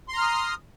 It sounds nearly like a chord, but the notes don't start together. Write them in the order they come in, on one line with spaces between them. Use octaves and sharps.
C6 A#5 F6 D#6